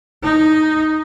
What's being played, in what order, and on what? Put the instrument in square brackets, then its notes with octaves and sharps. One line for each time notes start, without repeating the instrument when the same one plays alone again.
[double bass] D#4